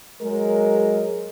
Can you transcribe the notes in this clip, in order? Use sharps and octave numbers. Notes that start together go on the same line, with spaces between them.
F#3 G#3 A#4